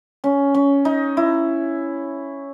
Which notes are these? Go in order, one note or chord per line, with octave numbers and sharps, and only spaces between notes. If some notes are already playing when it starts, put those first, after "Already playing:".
C#4
C#4
D#4
E4